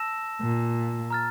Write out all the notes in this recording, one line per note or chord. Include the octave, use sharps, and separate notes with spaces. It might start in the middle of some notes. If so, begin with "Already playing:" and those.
Already playing: A5 E6 A#6 E7
A#2
A#5 F6 A6